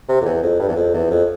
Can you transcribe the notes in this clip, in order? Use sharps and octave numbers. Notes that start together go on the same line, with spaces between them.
C3
F2
E2
F2
G2
E2
F2
E2
F2